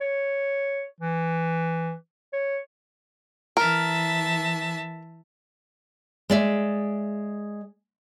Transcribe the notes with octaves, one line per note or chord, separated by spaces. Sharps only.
C#5
E3
C#5
E3 A#4 E5 A5
G#3 D5 E5